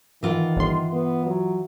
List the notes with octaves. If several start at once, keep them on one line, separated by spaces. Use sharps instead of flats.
D#3 E3 F4 F#5
G1 C6
B3
F#3